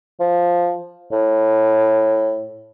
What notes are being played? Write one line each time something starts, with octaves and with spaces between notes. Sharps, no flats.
F3
A2